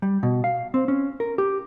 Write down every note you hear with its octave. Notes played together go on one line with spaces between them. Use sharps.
G3
B2
F5
C4
C#4
A#4
G4